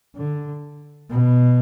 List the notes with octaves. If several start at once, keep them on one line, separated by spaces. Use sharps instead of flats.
D3
B2